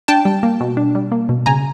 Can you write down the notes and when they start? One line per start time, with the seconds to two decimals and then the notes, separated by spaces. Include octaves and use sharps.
0.08 D4 G5 A5
0.25 G3
0.43 A#3
0.60 B2
0.77 D4
0.95 G3
1.12 A#3
1.29 B2
1.46 C#3 G#5 A#5